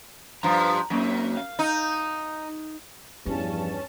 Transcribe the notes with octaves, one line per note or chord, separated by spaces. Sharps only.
G2 F3 A#5
F#2 F#3 A#3 C4
F5
D#4
E2 G2 F3 C#4 A5